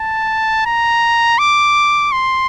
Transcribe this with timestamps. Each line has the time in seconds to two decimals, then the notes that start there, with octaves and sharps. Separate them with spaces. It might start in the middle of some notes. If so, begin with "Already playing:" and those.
Already playing: A5
0.66 A#5
1.39 D6
2.12 C6